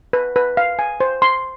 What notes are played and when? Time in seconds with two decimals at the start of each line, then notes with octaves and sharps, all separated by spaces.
0.13 B4
0.36 B4
0.57 F5
0.79 G#5
1.00 C5
1.22 C6